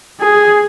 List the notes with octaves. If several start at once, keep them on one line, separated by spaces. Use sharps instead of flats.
G#4